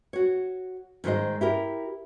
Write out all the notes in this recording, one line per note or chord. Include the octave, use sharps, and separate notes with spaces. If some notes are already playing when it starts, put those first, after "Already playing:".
F#4 C#5
G#2 D#3 G#3 G#4 C5 D#5
E4 G4 A#4